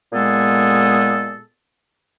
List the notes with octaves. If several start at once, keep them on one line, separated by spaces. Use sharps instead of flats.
A#2 G#3 B3 G#4 A4